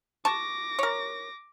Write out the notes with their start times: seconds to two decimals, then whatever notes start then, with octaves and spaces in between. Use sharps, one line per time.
0.25 A5 C#6 D6 A#6
0.79 A#4 C#5